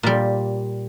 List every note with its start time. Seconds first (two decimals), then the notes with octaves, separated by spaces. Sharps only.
0.03 A#2 G3